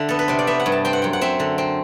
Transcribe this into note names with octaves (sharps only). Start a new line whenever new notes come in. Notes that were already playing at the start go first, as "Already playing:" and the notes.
Already playing: D3 E5
B3 A4
B4
C3 C5
D5
B3 E5
F#5
G2
A5
C4 G5
F#5
F#2 G5
F#5
C4 E5
D3
C4